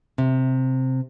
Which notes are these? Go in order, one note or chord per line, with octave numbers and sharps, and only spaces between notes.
C3